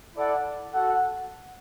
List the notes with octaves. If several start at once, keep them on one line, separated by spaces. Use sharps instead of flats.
E4 A4 D5 F#5
F#4 A4 F#5